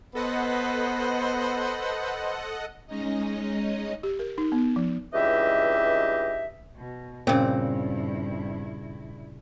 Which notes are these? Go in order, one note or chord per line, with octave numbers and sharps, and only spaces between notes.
B3 A4 B4 C5 D#5 F#5
G#3 C#4 D#4 D#5
G4
A#4
D#4
B3
F3
C#2 G2 E3 G4 D#5 E5
B2
G2 A#2 C#3 C4 E4